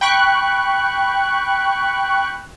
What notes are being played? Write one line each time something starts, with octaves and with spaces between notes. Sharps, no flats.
G5 B5 C#6 F#6